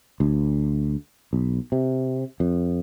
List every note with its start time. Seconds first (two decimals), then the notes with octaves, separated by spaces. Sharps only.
0.20 D2
1.33 B1
1.72 C3
2.40 F2